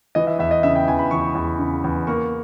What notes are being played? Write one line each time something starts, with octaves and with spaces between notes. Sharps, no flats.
E3 D#5
E5
E2 E5
D#5
C#3 E5
G5
E2 G#5
B5
E3 C#6
E2
C#3
E2
A#3 C#6